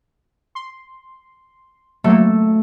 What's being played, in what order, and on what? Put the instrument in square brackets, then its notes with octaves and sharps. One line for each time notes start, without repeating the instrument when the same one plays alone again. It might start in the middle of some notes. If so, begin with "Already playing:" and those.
[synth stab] C6
[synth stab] F#3 A#3 [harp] A3